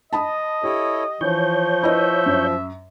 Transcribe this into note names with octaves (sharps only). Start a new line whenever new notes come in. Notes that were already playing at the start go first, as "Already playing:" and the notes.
D#5 A5 B5 D#6
E4 G4 A4 C#5
E3 F3 C#5 G6
E4 B4 D#5 E5
F#2